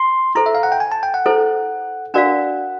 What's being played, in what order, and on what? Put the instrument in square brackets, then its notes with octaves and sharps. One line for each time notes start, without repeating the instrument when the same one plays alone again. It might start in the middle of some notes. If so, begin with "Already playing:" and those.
Already playing: [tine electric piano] C6
[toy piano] E4 A4 C5 [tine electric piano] A#5
[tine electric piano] E5
F5
F#5
G5
G#5
A5
G5
F#5
[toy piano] E4 A4 C5
[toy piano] D4 F#4 A#4 D5 F5 [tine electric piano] F#5